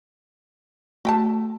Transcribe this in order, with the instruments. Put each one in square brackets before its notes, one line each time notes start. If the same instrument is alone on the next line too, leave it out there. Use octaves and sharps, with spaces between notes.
[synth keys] A3 [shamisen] F#4 G5 A5